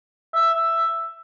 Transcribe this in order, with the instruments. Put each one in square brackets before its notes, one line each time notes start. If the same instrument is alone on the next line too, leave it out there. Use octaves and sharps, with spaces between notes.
[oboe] E5